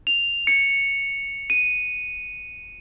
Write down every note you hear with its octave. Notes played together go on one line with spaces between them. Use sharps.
F7
C#7
D#7